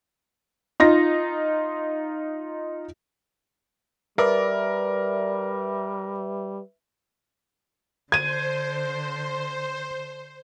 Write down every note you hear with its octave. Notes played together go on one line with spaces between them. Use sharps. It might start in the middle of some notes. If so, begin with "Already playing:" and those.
D#4 F4 A#6
G3 A#4 B4 D5 E5
D3 C5 G#6 D#7